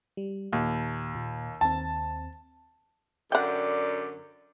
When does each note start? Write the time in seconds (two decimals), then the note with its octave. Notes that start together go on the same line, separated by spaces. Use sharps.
0.17 G3
0.53 D#2 A#2
1.15 A#2
1.61 D#2 C4 A5
3.32 F#2 D3 D5 F#5 G5